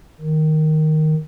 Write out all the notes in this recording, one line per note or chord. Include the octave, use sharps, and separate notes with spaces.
D#3